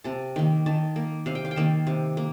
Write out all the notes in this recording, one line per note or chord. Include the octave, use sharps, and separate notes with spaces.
C3 A5
D#3 A#3
D#3 A5
A#3
C3 F5
G5
F5
G5
D#3 A#3 A5
C3
A#3